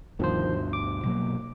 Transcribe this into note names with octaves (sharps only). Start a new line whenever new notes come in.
D2 G2 B2 D#3 F3 C5
D6
B2 F#3 A#3